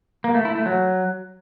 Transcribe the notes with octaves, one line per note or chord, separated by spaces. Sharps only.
A#3
A3
E4
A3
F#3